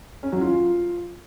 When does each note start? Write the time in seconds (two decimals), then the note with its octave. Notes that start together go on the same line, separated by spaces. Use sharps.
0.23 C#4
0.32 F#3
0.41 F4